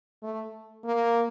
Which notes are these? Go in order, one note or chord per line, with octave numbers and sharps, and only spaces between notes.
A3
A#3